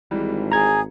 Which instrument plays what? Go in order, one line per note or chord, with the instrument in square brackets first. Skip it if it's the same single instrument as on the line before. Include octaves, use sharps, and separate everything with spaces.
[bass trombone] G#1 [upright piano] G#2 E3 G3
[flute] G#4 [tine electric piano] A#5 G#6